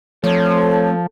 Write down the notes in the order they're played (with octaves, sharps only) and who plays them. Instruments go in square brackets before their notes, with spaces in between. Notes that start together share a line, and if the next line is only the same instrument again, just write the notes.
[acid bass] F3 [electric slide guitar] A3 C4 [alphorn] A4 [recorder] C#5